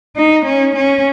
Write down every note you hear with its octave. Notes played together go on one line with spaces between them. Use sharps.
D#4
C#4
C#4